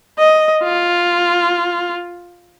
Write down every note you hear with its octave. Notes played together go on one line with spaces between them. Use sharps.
D#5
F4